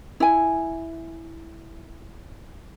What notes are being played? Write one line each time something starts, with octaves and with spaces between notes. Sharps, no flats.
E4 G#5